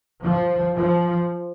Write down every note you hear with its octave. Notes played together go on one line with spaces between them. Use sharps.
F3
F3